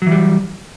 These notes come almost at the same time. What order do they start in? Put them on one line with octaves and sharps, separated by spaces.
F#3 E3 G3